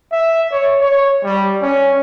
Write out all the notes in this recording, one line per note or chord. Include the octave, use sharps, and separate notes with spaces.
E5
C#5
C#5
G3
C#4